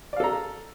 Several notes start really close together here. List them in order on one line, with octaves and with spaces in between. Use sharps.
D5 F5 A4 A#5